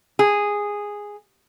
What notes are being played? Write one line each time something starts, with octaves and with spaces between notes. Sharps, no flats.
G#4